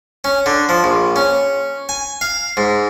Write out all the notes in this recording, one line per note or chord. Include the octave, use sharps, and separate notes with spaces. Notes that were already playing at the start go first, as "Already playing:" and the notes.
C#4
D3
F3
A#1
C#4
G#5
F5
G#2